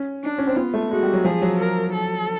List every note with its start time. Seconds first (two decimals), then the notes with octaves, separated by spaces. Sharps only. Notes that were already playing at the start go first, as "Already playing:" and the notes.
Already playing: C#4
0.23 D4
0.38 C#4
0.47 C4
0.56 B3 F4
0.74 A3
0.91 G#3 F#4
1.03 G3
1.13 F#3
1.24 F3 G#4
1.42 F#3
1.59 A#4
1.93 A4